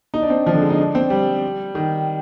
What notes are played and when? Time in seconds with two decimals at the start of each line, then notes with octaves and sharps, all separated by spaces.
0.14 D#4
0.22 D4
0.30 C4
0.46 F3
0.54 D3
0.62 G#3
0.70 D#4
0.78 D4
0.95 C4
1.10 G3
1.75 D#3